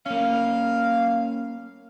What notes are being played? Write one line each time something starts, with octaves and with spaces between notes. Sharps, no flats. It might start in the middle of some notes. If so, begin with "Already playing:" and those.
A#3 C#4 F5